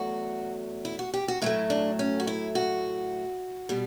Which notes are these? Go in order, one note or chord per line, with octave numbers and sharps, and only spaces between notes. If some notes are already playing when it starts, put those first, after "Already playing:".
Already playing: E2 F#3 A3 F#4
E4
F#4
G4
F#4
A2 F#3 A3 E4
D4
C#4
F#4
E4
F#4
B2 G3